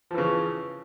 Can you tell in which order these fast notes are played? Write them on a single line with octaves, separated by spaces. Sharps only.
F3 E3 C#3